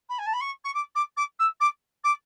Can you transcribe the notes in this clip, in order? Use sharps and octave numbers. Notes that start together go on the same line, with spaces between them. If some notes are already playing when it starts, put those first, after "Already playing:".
B5
G#5
A5
B5
C#6
C#6
D6
D6
D6
E6
D6
D6